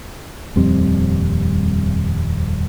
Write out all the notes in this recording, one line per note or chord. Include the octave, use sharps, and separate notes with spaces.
D#1 F2 G3 C4